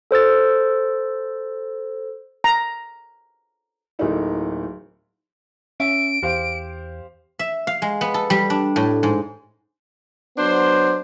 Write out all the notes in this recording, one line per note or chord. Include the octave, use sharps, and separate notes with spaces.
A4 C5 E6 A6
A#5
D1 A3 A#3 D#4 E4
C#4 E5 D7
E2 G4 C5 F5
E5
F5
G#3
B3
A4
G3
D4
A2
G#2
F#3 B3 D4 C5